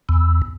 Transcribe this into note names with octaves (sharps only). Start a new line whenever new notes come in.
E2